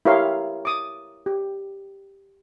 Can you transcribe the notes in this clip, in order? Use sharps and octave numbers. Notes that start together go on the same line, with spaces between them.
E4 G4 A#4 C#5 F5 C6
D6 D#6
G4